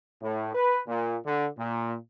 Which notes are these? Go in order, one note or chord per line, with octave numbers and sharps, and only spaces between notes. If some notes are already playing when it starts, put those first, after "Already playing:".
A2
B4
A#2
D3
A#2